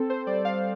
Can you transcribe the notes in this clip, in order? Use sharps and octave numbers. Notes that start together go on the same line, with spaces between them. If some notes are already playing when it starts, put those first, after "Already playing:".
Already playing: C4 A4
C5
G3 D5
F5